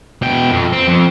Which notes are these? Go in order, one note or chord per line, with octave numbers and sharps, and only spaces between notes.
B2 G5
F2
C4
F2